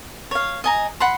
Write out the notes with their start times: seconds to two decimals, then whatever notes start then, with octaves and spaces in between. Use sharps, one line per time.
0.31 C#5 F5
0.64 D#5 G#5 A#5
1.00 F#5 B5 C6